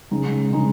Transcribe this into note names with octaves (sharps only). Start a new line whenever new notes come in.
C#3 G#3 D#4
C#3 G#3 D#4